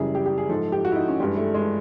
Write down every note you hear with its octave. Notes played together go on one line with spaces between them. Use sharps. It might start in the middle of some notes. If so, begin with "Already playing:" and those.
Already playing: F#2 C#3 E3 G3 G#4
G4
G4
G#4
G#2 F3 A4
G4
F#4
E4
D#4
C#4
G2 E3 G3 G#3
A3
G#3